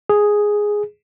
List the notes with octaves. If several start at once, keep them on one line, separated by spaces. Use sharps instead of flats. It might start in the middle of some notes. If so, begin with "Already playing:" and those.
G#4